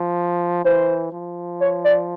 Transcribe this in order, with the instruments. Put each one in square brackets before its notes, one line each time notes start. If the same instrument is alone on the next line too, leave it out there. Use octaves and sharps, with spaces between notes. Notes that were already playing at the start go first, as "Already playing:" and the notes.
Already playing: [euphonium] F3
[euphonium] E3 [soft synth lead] C5
[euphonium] F3
[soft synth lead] C#5
D5